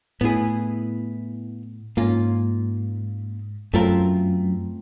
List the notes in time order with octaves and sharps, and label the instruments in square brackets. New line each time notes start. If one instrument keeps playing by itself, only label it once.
[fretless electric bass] A2 [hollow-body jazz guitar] B3 E4 G#4
[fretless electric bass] G#2 [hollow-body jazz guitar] A#3 C#4 F4
[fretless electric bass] F#2 [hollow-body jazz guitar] A3 C4 F4 A#4